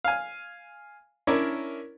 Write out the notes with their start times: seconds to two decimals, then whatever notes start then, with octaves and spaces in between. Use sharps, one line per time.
0.04 F5 G#5
1.27 C#4 D4 E4 A#4 C#5 D5